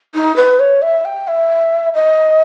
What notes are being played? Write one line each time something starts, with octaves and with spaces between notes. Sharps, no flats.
D#4
B4
C#5
E5
G5
E5
D#5